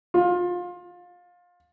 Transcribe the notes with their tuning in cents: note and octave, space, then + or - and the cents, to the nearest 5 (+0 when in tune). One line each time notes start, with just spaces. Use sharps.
F4 +25